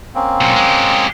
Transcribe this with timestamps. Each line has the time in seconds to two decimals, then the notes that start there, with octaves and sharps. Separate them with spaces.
0.15 A#3 C4 C#4
0.41 B1 A#2
0.56 G#3 G4